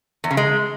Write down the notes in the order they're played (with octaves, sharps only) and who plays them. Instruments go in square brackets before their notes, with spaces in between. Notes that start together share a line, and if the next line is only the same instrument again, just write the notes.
[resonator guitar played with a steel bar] E2
C#3
G#3